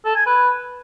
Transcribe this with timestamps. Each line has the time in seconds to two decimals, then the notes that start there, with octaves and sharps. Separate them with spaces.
0.05 A4
0.16 G#5
0.26 B4